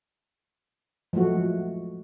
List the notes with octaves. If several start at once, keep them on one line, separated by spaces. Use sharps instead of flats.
F3 F#3 G#3 A3 F#4